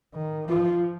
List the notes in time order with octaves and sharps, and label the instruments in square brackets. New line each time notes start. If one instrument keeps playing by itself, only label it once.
[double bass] D#3
[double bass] F3 [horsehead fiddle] F4